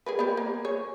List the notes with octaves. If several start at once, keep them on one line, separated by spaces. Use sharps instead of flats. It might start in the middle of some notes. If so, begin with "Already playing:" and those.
G#4 A#4 B4
B3 G4
A#3
G#4 C#5